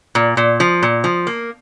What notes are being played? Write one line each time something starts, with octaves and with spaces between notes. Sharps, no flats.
A#2
A#2
F3
A#2
F3
A#3